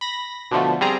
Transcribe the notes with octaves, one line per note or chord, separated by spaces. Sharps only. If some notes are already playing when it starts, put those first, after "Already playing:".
B5 A#6
B2 D3 F3 A3
G3 C4 G#4 A#5